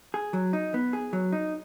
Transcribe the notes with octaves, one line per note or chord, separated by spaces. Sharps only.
G#4
F#3
D#4
B3
G#4
F#3
D#4